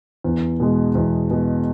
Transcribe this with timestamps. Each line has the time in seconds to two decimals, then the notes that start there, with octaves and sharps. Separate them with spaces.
0.24 E2
0.60 B2 G#3
0.95 E2
1.31 B2 G#3